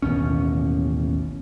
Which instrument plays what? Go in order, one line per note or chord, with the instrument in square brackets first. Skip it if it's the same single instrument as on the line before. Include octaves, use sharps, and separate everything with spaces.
[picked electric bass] A1 D#2 B2 C#4